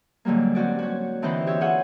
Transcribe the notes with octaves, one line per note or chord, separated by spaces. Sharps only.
G#2 D3 F#3 G3 A#3
C4 C#4 F#4 D5
F#4 C#5
D3 E3 C4 D#4 B4 C5
G4 C#5 E5
F4 G#4 C#5 F#5